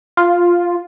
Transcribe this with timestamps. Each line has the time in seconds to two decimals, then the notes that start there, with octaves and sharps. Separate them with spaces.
0.17 F4